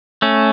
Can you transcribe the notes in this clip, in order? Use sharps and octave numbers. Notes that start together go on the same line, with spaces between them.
A3 C#4